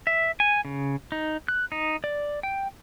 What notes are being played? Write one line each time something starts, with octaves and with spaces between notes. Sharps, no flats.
E5
G#5
C#3
D#4
F#6
D#4
D5
G5